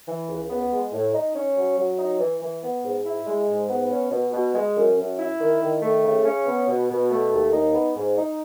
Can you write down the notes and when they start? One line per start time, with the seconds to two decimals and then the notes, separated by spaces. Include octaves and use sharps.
0.07 E3
0.28 C#2
0.49 B3
0.71 G#3
0.92 A2
1.13 D#4
1.34 C#4
1.56 F#3
1.77 F#3
1.99 D#4
2.19 E3
2.41 E3
2.62 B3
2.83 G#2
3.05 E4
3.27 G#3
3.48 G#2
3.69 B3
3.90 C#4
4.11 B2
4.32 B2
4.54 G#3
4.76 F#2
4.97 F#2
5.18 E4
5.39 D#3
5.60 D#3
5.82 A3
6.03 C#3
6.25 C#4
6.46 B3
6.67 B2
6.88 B2
7.10 A3
7.32 D#2
7.52 D#4
7.74 B3
7.95 G#2
8.17 D#4